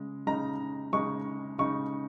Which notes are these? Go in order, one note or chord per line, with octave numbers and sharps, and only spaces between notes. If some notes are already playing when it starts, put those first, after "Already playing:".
Already playing: C#3 G#3
C#3 G#3 D#4 A#5
C#3 G#3 D#4 C#6
C#3 G#3 D#4 C#6